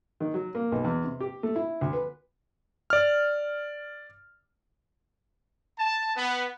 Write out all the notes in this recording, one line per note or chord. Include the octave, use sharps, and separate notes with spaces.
D#3
F#3
A#3
B1
E2
C3
G4
A3
E4
D2
B4
D5 F6
A5
B3